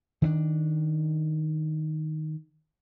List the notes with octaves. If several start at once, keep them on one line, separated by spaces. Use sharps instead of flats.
D#3 C4 D4